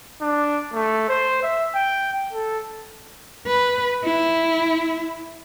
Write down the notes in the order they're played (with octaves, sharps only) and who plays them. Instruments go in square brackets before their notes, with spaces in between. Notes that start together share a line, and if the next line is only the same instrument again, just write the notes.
[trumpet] D4
A3
C5
E5
G5
A4
[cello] B4
E4